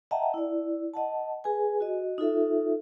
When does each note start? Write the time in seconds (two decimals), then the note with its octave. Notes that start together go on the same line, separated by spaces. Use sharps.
0.11 D#5 E5 F#5 G5 A5 A#5
0.34 E4 D5
0.93 D#5 F#5 A5
1.44 G#4 B4 G#5
1.80 F#4 D#5
2.18 D#4 F4 A4 E5